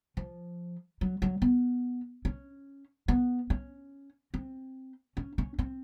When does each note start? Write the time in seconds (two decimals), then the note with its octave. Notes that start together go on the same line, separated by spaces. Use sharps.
0.17 F3
1.01 F#3
1.22 F#3
1.42 B3
2.25 C#4
3.08 B3
3.50 C#4
4.34 C4
5.17 C#4
5.38 C#4
5.59 C4